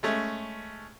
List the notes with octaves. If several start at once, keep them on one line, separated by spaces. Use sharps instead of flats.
G#3 A3 C#4